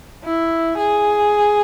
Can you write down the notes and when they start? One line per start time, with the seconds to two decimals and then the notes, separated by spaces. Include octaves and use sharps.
0.24 E4
0.77 G#4